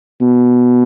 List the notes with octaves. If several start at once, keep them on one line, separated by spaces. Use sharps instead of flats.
B2